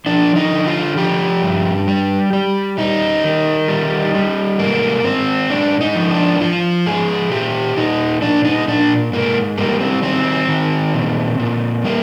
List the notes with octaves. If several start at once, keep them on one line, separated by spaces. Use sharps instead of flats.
F3 D4
D#4
D3
F4
F3 G4
G2
G3
G3
G3 D#4
D#3
G3
G3
G#2 A#3
G#2 C4
G#2 D4
D#4
F3
D4
F3 F4
G#2 G#4
A#2 G4
A#2 D#4
A#2 D4
D#4
A#2 D4
G#2 A#3
G3 A#3
C4
D#3 C4
D#3
A#2
A#2
G3 A#3